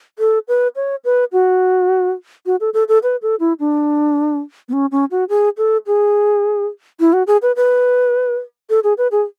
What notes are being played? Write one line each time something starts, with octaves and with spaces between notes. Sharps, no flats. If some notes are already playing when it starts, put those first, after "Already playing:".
A4
B4
C#5
B4
F#4
F#4
A4
A4
A4
B4
A4
E4
D4
B3
C#4
C#4
F#4
G#4
A4
G#4
E4
F#4
G#4
B4
B4
A4
G#4
B4
G#4